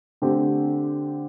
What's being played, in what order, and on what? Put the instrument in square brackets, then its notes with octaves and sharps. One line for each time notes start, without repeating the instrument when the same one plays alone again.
[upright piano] D3 A3 C4 G4